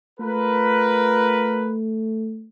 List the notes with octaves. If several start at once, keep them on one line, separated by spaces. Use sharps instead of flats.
A3 F4 A#4 B4